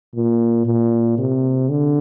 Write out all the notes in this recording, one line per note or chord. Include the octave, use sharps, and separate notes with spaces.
A#2
A#2
C3
D3